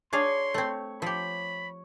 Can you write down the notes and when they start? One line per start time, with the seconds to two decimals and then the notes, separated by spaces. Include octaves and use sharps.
0.13 D4 G#4 C#5 F5 C6
0.54 A3 C4
1.02 F3 G4 B5